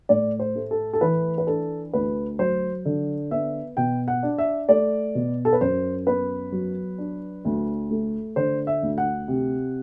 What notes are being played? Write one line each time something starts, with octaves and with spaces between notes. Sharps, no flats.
A2 D5
C5
A3
A4
A4
E3 B4
B4
D4 A4
D2 B4
F#3 C5
D3
B3 E5
B2 G5
F#5
D4
E5
A3 D5
B2
A4
B4
F#2 C5
B3 B4
F#3
D4
D2
A3
D3 C5
E5
D2
F#5
C3